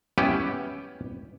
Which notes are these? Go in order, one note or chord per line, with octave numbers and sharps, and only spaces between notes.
B3 C#4 E4 G4 B4